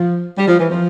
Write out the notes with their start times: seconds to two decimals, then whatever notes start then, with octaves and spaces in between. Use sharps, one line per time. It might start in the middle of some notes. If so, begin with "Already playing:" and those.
Already playing: F3
0.37 G3
0.47 F3
0.59 E3
0.69 F3